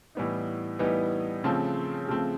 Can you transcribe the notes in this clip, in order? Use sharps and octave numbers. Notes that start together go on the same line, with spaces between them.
A2 E3 G3 B3 D#4
A2 E3 G3 B3 D#4
C#3 F3 A3 C4
C#3 F3 A3 C4